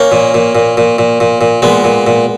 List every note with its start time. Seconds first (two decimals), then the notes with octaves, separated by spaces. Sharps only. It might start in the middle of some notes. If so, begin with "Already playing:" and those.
Already playing: A#3 C#4
0.12 A#2
0.34 A#2
0.55 A#2
0.77 A#2
0.98 A#2
1.20 A#2
1.41 A#2
1.62 A#2 G#3 B3
1.84 A#2
2.07 A#2